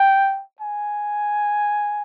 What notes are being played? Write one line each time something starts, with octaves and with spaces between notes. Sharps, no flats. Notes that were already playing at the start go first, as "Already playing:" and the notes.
Already playing: G5
G#5